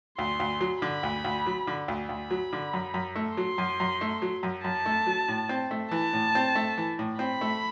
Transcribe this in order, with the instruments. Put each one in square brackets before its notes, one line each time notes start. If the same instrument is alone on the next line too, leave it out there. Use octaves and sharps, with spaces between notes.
[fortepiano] D2 [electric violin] C6
[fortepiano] D2
F#3
[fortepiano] D3 [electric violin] B5
[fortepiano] D2
D2
F#3
D3
D2
[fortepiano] D2 [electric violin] B5
[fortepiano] F#3
D3
F#2
F#2
A3
[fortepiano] F#3 [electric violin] C6
[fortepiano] F#2
F#2
A3
F#3
F#2
[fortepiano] F#2 [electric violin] A5
[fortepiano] A3
F#3
A2
C4
A3
[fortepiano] E3 [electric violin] A5
[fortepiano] A2
C4
A3
E3
A2
[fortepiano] C4 [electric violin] B5
[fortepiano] A3